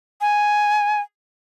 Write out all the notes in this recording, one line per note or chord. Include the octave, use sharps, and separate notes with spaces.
G#5